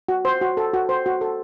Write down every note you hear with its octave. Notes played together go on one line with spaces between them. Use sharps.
F#4
C5
F#4
A4
F#4
C5
F#4
A4